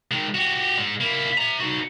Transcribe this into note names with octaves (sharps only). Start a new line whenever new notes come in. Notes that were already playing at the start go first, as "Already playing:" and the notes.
D#3 G#3
F#4 G4
G#2 G#3
A#3 E4
E5 A#5
D#4 F#4